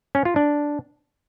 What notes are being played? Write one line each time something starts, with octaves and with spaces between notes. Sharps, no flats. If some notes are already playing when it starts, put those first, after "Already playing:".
C#4
F4
D4